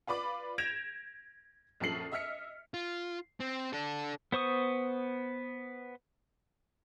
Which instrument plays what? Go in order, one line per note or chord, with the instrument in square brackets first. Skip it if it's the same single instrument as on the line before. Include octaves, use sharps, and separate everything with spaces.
[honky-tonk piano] F4 B4 D5 B5 D6
G6 G#6 A#6 D7 E7 F7
A#1 F#2 F3 A4 C7 F#7
D#5 E5 E6 F6 B6 C#7
[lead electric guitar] F4
C4
D4 A4
[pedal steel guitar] B3 C5 C#6 D#6